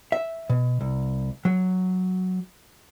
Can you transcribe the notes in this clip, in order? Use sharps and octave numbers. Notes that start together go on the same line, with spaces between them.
E5
B2
C2
F#3